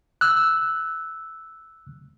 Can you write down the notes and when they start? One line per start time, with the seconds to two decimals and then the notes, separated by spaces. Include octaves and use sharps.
0.21 E6 F#6